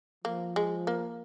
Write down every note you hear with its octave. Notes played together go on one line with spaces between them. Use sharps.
F3 A#3
G#3
A#3